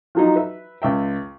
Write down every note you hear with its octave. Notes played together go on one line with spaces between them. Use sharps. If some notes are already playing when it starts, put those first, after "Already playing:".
F3 F#3 D#4
B4 E5
C#2 E5 G5